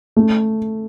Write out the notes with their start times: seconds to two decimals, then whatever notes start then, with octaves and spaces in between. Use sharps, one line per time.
0.17 A3